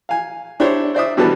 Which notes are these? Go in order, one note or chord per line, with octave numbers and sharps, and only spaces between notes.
F5 G#5
D4 E4 G4 C5 C#5
C5 D5 E5 D#6
B2 D3 E3 G3 B3 A5